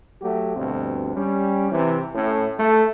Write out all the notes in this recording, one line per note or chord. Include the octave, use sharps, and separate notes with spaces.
F#3 A3 F#4 G4
D2 G2 B2 C4
G3 C#4
C3 E3
A2 C#4
A3